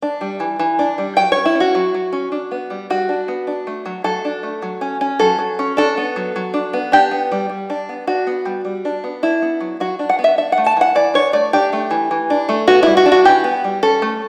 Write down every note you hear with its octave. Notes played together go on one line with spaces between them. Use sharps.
D4
G3
E3
E3
D4
G3
F#3 G5
C#4 C#5
E4
C#4
F#4
F#3
F#3
C#4
D4
B3
G3
G3 F#4
D4
B3
D4
A3
F#3
F#3 A4
D4
A3
F#3
C#4
C#4
F#3 A4
F#3
C#4
D4 A4
B3
F#3
F#3
D4
B3
D4 G4
B3
G3
G3
D4
B3
D4 F#4
B3
G3
G3
D4
B3
D4 E4
B3
F#3
F#3 F#4
D4
F#5
B3
E5
D4 E5
F#5
A3
A5
E3 F#5
E3 D5
D4 C#5
A3 D5
D4 G4
A3
E3
E3
D4
A3
B3 F#4
G3 E4
F#4
D4
F#4
E3 G4
B3
G3
C#4 A4
A3